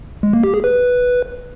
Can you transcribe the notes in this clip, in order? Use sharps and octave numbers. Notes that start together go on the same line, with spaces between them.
G#3
A#3
G4
G#4
B4